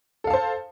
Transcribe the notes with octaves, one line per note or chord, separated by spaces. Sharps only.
A4 C5 F5 A5